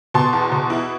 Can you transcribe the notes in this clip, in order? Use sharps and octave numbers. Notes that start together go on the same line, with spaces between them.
B2 A5 C6
E2
B2
E4